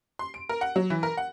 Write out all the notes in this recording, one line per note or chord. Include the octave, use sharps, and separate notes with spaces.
C6
D7
A#4
F#5
F#3
E3
A#4
F#5